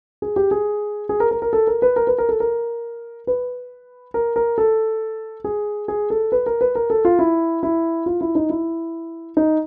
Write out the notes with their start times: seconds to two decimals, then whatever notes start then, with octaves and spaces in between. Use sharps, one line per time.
0.22 G#4
0.36 G4
0.51 G#4
1.09 G#4
1.20 A#4
1.31 A#4
1.42 A#4
1.53 A4
1.67 A#4
1.82 B4
1.96 A#4
2.07 B4
2.18 A#4
2.29 A4
2.40 A#4
3.27 B4
4.14 A#4
4.36 A#4
4.58 A4
5.44 G#4
5.88 G#4
6.10 A4
6.32 B4
6.46 A#4
6.61 B4
6.75 A#4
6.90 A4
7.05 F4
7.19 E4
7.63 E4
8.06 F4
8.21 E4
8.35 D#4
8.50 E4
9.37 D#4